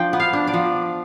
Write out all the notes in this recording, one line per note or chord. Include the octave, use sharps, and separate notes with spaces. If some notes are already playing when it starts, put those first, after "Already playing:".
Already playing: F3 D4 G5
B3
F5
D4
D5
F3